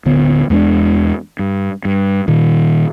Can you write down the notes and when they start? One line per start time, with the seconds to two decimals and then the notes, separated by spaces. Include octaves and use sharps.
0.05 D1 D3 B3
0.50 E2 G#3 B3 D4
1.39 G2
1.85 G2
2.28 A#2 D#3